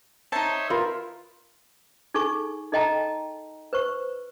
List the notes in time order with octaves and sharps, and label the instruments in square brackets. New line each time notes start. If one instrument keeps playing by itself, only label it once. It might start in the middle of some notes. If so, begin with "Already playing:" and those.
[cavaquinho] D#4 A5 [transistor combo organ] C5 C#5 E5
[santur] F4 A#4 B4
[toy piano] D#4 G#4 A4 G#5 C#6
D#4 A4 D#5 G5 A5 A#5
B4 C5 C#6